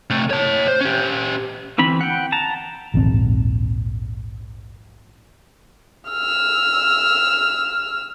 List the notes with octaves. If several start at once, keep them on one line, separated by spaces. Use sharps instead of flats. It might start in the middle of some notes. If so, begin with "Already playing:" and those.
C3 A3
C#5 A5
C5
C#4 G4
D3 E3 C4 B5
F#5 G5
A5 A#5
A#1 D#2 G#2 C4
E6 F6